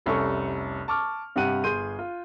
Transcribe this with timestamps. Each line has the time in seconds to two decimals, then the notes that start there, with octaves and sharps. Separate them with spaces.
0.06 F1 C2 C3 C#4 A4 C#6
0.88 A5 C#6 D6 F6
1.36 G2 C3 G4 F#5 F#6 D#7
1.64 G1 G#4 C6 G6 D#7
1.99 F4